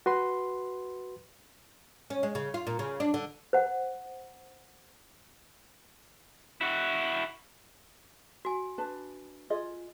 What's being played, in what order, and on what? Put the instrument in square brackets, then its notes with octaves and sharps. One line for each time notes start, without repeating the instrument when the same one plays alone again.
[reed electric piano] F#4 B4 C6
[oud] C#4
G#3
C#3
F4
A#2
C#3
D4
D3
[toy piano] C5 F#5
[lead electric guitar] E4 F#4
[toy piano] F#4 G#5
[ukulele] D4 B4 A5
F4 G#4 D#5